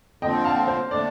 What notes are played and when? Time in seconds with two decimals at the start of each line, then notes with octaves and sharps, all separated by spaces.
0.22 D3 F3 C4 D#5 G5
0.44 F5 A5
0.68 C5
0.91 D3 A3 D4 D5